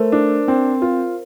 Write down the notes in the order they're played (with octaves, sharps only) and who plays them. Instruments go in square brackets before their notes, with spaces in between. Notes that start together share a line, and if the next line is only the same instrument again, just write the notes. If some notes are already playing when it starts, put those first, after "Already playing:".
Already playing: [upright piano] A3 [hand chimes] A#4 C5
[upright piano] D4
C4
F4